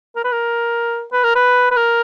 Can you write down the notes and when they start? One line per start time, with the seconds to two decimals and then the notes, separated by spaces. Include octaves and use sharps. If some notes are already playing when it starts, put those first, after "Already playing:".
0.16 A#4
0.24 B4
0.32 A#4
1.13 B4
1.24 A#4
1.35 B4
1.71 B4
1.76 A#4